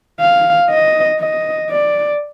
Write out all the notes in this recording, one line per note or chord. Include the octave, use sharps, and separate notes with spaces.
F5
D#5
D#5
D5